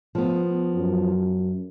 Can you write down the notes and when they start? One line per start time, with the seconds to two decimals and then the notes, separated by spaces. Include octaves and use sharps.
0.15 F3 B3
0.74 F#2